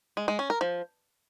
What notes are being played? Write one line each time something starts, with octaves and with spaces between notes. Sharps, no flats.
G#3
G#3
C#4
A#4
F3